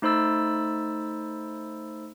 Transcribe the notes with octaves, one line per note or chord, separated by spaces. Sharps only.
A3 D#4 C5 B5 E6 A6